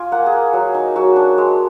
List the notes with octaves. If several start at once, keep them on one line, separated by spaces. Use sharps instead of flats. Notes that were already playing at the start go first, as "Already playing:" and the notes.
Already playing: F4 G#5 D6
A#3 F#5
G#4
A#3
F#3
D#4
F#3 F#4
D4
G#3